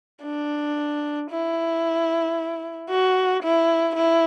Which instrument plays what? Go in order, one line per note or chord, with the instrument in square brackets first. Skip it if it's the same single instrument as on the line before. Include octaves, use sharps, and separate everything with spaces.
[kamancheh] D4
E4
F#4
E4
E4